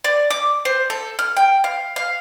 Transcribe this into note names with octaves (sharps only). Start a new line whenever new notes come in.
D5
D6
C5
A4
F6
G5
F5
F5